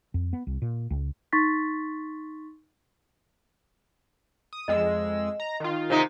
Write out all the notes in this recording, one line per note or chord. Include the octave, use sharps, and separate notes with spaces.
F2
B3
C2
A#2
C#2
D#4 C6 C#6 A6 B6
D#6
F2 G#3 D#5 E6
A#5
D#3 F4
C3 D#4